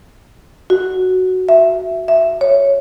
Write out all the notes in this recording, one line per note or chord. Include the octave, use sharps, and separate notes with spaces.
F#4
E5
E5
C#5